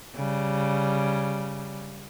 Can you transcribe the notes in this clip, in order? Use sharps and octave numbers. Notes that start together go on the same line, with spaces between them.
C#3 G3